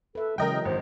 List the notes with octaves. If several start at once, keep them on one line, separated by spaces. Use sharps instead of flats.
A4 B4 E5
C#3 E3 F#3 G#3 A#4 D#5 G5
G#1 C5